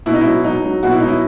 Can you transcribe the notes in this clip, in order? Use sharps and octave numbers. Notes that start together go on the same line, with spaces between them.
B2 E4
D#4
F#3 E4
F#3 D#4
F#3
B2 F#4
E4
F#3 D#4
E4